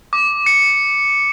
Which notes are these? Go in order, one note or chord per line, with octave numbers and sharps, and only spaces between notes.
D6
C#7